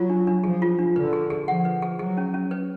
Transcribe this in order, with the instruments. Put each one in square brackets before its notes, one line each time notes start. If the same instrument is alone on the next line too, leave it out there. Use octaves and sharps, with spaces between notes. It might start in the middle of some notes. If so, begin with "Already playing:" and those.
Already playing: [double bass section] F#3 [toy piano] F4
[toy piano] D4
D4
[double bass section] F3 [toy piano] G#4
[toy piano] F4
D4
[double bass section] D3 [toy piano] B4
[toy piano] G#4
G#4
[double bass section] F3 [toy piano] F#5
[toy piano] B4
G#4
[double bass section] F#3 [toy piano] G#4
[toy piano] C#4
C#4
B4